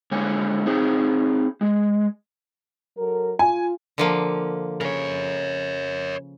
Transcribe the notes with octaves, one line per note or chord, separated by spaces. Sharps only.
D3 G#3 A#3 C#5 F#5 G#5
C4 D#4 G#4 C#5
G#3
F#3 A4 A#4
F4 G#5
D3 F3 A#3
C#3 A#4 C#5